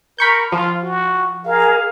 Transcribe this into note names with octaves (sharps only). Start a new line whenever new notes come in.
A#4 B5 C#6 G6
F3 F4
F#4
G#4 A#4 F5